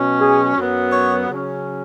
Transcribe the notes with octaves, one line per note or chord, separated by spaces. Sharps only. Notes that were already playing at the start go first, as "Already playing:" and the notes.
Already playing: B2 F#3 C#4
G#4
F#2 F#3 B3
C#5
C#3 F#3 C#4